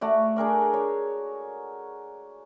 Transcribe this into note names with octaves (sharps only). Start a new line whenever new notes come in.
A3 F#4 D5
D4 G#4 A#4 D5
C#5